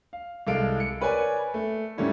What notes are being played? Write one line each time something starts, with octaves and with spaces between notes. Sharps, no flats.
F5
C2 G#3 A4 F5 D7
C#7
A#4 B4 C#5 D5 G#5
A3
G#2 D3 G3 A3 C#4 E4